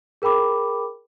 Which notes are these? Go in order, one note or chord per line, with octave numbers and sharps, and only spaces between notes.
G#4 A#4 G5 B5 D6